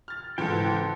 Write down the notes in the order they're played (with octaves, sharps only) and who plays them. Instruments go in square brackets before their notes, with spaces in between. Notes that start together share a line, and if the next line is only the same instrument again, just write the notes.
[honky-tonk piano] F6 A6
[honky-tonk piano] G#2 C#3 E3 [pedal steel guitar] A4 G5